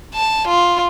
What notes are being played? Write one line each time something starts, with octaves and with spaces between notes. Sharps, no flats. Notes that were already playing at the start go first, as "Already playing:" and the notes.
A5
F4